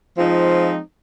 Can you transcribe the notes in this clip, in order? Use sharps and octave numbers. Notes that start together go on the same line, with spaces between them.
F3 G#3 C4 D#4 F4